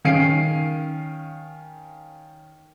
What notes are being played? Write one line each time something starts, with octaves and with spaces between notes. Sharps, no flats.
D#3 C#4 F5 C7 D7 D#7